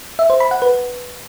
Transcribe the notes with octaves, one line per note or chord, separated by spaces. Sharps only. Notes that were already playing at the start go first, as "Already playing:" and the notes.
E5
C5
B5
F#5
B4